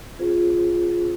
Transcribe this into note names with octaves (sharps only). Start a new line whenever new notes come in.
C4 F4 G#4 C5